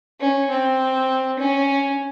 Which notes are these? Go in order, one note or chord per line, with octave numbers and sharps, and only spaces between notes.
C#4
C4
C#4